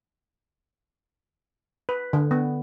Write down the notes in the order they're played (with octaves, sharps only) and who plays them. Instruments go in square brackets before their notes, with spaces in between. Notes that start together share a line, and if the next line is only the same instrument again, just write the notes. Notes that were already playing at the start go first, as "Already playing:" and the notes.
[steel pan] B4
D3
B3